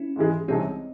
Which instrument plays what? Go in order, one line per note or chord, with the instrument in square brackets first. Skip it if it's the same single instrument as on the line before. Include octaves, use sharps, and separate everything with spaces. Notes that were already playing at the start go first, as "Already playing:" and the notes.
Already playing: [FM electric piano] C#4 E4
[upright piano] G#2 E3 G#3
[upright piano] C2 C3 E3 G#3 C#4 [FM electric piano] C4 D#4